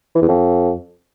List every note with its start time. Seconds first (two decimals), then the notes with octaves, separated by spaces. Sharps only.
0.15 E3
0.22 E2
0.28 F2